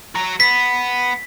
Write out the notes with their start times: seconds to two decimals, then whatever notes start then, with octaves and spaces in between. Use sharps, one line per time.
0.15 F#4 A#5
0.40 B3 B6